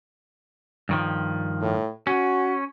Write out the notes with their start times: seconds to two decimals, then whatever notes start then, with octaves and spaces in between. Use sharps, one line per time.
0.89 G2 D#3 F3
1.61 A2
2.07 C#4 F#4